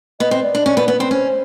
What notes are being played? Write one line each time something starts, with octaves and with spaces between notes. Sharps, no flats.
B3 D#5
C4
D5
D4
C#4
B3
B3
C4
C#4 C5